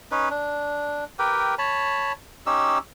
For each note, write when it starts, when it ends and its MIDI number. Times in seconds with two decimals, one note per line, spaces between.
0.11 0.29 61
0.11 0.29 63
0.11 0.29 71
0.30 1.05 62
1.19 1.55 67
1.19 1.55 70
1.19 1.55 71
1.19 1.55 79
1.58 2.12 73
1.58 2.12 81
1.58 2.12 83
2.46 2.78 61
2.46 2.78 63
2.46 2.78 67
2.46 2.78 88